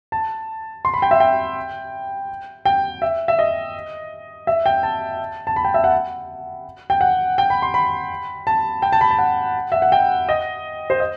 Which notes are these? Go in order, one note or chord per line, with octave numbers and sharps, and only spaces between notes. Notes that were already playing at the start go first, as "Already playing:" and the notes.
A5
C6
B5
G5
E5
G5
G5
E5
E5
D#5
E5
G5
A5
A5
B5
G5
E5
F#5
G5
F#5
G5
B5
C6
B5
A5
G5
A5
B5
A5
F#5
E5
F#5
G5
D#5
C5
D#5